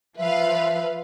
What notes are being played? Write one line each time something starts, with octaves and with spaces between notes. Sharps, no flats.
F3 B4 E5 F5